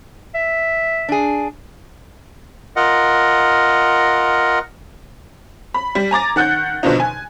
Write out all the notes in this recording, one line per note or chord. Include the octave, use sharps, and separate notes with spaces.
E5
D4 G#4
F4 A#4 D#5 F#5
B5
G3
G#5 A#5 D6 A6
D#3 F#5 F#6 G6
B2 D3 D#3 F3 D#4
G#5